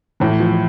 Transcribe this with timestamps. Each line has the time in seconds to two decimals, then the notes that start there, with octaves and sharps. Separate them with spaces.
0.20 A2 E3
0.40 F3